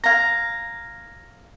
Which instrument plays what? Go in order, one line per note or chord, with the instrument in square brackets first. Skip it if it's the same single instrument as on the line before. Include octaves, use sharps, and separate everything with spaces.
[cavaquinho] F5 A#5 [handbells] G#6 A#6